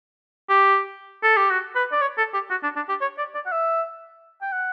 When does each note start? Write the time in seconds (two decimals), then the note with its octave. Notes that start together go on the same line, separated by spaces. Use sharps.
0.49 G4
1.23 A4
1.37 G4
1.51 F#4
1.76 B4
1.92 D5
2.01 C#5
2.18 A4
2.34 G4
2.50 F#4
2.63 D4
2.76 D4
2.89 G4
3.01 C#5
3.18 D5
3.35 D5
3.46 F#5
3.52 E5
4.42 G5
4.52 F#5